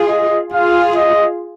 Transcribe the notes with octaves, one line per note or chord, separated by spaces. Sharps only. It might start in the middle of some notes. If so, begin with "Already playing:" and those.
Already playing: F4 G#4
D#5
F4 G#4 F5
D#5